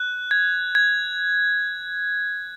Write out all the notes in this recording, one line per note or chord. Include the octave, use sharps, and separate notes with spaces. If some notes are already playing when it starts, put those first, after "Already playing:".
Already playing: F#6
G#6
G#6